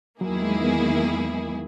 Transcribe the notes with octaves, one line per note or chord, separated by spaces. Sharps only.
E2 D#3 F#3 A#3 E4 G#4
G#3
B3